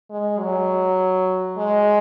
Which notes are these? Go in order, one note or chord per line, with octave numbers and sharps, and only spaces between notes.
G#3
F#3
G#3